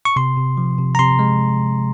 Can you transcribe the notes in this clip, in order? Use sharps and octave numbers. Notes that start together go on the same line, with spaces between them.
C#6
C3 C6
C3
F3
C3
A#5
C3 C6
G#3